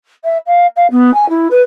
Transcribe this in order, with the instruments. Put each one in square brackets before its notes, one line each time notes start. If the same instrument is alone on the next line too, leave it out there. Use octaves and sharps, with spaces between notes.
[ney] E5
F5
F5
B3
G#5
E4
B4